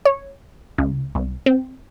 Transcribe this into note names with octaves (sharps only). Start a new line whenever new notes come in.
C#5
C#2
C2
C4